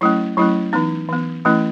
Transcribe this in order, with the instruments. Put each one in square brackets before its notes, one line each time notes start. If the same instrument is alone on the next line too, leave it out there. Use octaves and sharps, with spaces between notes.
[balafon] F#3 A3 C#4 E4
F#3 A3 C#4 E4
E3 B3 D#4
E3 B3
E3 A3 C#4 E4